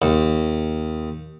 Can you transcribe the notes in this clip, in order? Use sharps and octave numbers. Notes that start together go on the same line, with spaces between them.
D#2